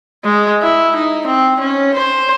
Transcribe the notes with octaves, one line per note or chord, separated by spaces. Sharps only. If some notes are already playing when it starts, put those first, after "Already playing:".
G#3
E4
D#4
C4
C#4
C5